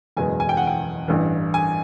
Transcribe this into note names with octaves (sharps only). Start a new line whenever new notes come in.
F#1 E2 B2 G#3 G#5
G#5
G5
F#5
G5
A1 G2 E3
G#5